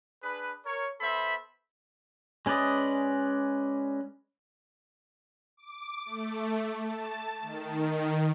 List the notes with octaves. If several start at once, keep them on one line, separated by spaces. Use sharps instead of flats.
D4 G#4 B4
A#4 C#5
B3 A4 C5 E5 B5
G#3 C#4 B4 D5 D#5
D6
A3
A5
D#3